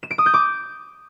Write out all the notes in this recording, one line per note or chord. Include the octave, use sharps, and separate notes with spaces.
E7
D7
D#6
G6
D6